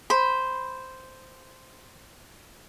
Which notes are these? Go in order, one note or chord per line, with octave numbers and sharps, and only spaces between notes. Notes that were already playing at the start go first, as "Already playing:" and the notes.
C5 B5